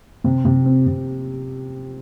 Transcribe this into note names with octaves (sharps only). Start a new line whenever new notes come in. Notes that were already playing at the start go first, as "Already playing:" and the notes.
C3
C3
C4
C3